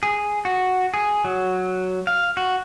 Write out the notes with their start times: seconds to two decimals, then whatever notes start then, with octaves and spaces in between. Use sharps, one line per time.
0.03 G#4
0.45 F#4
0.94 G#4
1.25 F#3
2.07 F5
2.37 F#4